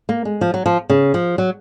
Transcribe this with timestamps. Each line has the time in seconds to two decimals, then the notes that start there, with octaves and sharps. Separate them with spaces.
0.09 A#3
0.25 G#3
0.41 F3
0.54 F#3
0.66 F3
0.89 C#3
1.14 F3
1.38 F#3